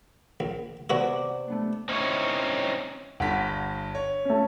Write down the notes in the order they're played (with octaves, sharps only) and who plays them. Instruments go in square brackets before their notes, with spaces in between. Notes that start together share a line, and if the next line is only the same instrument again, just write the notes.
[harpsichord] A#1
[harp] C3 B3 D5 [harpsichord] E4 F#4 B4
[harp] A3 B3 D4
[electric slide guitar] C4 C#4 D#4 E4 C#5
[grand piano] G1 G2 B6 [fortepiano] F#5
[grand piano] C#5
[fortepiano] A3 C#4